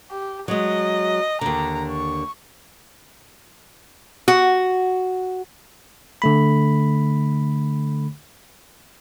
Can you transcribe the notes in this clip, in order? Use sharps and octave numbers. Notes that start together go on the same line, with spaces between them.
G4
F#3 G#3 D#5
D#2 D3 A#5
C#6
F#4
D3 A3 B5